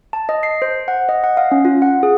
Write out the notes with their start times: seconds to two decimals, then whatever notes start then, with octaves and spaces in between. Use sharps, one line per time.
0.13 A5
0.29 D#5
0.43 C7
0.62 C5
0.88 F#5
1.09 D#5
1.24 F#5
1.37 F5
1.52 C#4
1.65 F4
1.82 F#5
2.03 G#4